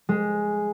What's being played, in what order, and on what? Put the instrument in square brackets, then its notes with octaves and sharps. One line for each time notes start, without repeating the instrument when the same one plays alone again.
[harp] G#3